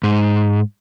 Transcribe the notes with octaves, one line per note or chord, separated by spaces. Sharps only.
G#2